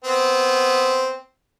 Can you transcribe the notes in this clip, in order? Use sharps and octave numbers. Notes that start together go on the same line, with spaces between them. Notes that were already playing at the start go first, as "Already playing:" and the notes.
B3 C4